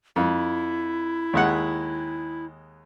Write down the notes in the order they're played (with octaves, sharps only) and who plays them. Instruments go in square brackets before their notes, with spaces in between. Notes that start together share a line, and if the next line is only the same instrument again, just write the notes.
[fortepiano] F2 [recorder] E4
[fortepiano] D#2 G#3 F#5